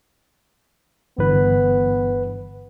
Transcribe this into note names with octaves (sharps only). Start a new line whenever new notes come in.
G1 G2 D3 E3 B3 B4